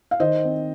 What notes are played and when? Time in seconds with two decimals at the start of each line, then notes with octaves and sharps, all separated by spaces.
0.11 F5
0.20 D#3 C5 D#5
0.44 C4